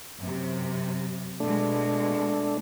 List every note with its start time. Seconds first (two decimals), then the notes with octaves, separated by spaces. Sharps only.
0.19 F#2 C3
1.40 B2 G#3 A3 D4